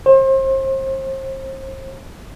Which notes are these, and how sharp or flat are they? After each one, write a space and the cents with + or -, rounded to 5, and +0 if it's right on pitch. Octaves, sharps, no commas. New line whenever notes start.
C5 +35